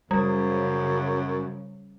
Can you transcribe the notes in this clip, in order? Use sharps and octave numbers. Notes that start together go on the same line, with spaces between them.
F#2 C#3 G3